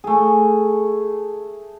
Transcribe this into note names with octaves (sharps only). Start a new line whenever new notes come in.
A3 G#4